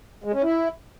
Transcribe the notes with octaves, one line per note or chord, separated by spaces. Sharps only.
G#3
C#4
E4